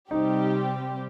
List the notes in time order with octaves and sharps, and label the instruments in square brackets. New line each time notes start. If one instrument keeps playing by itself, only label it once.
[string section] C3 G3 C4 G4 [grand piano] D#4